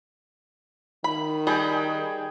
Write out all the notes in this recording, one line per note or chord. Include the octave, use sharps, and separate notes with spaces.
D#3 B5
G3 G#4 B4 D#5 G5